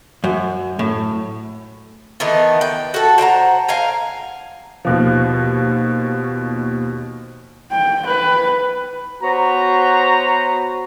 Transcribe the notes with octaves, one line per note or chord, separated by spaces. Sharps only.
F#2
A2
D#3 E3 A3 B3
G5
F#4 A4
C5 F#5 G5 A#5
F5 G5 G#5 A#5
D#2 B2 F3
G5
B4
B3 F#4 C5 C#5 A#5